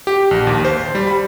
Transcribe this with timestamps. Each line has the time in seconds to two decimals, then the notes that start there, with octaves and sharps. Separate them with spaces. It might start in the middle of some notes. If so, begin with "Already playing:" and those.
0.07 G4
0.31 A#1
0.47 D#2
0.65 C5
0.95 G3
1.07 B5